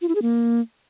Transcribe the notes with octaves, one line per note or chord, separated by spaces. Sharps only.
F4
E4
G#4
A#3